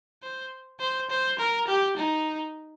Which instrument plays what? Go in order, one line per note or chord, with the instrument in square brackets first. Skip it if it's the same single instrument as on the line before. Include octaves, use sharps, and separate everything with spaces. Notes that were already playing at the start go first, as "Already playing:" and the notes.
[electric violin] C5
C5
C5
A#4
G4
D#4